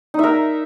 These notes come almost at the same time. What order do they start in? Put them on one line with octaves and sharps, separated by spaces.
D#4 E5 A#4